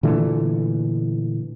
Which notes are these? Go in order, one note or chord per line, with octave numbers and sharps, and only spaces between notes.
A#2 D3 E3 A3